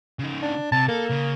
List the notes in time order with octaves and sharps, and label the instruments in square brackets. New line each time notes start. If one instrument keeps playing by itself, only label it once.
[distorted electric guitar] C#3 D#4
[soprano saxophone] D4
[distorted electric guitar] C3 [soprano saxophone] A5
[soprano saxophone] A#3 [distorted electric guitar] A4
[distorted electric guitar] C#3